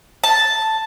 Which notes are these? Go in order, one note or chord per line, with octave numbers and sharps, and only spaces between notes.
A5